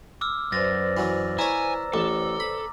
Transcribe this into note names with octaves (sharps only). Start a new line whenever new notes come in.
D6 E6 F6
F#2 B4 C5 D5 A6 A#6
E3 F#3
E4 C#5 G#5 A#5 E6
A1 A4 D6
B5